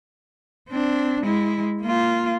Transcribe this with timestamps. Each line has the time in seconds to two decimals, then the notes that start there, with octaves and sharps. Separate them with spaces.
0.69 C4 D4
1.24 G#3 E4
1.81 A#3 F4